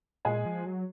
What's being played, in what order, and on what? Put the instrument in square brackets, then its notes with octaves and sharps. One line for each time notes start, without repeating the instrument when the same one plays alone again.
[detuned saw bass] A#2 [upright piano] G#3 G#4
[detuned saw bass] F3
F#3